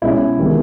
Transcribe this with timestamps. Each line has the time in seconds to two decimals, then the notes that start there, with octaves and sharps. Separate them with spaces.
0.02 B2 G#3 C#4 E4
0.37 C3 D#3 G#3 B3